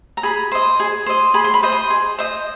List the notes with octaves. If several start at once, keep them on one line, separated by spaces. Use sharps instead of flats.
A#5
G#4 B5
C5 D#5
G#4
C5 D#5
G#4 B5
C6
B5
C5 D#5
C6
G#4
C5 D#5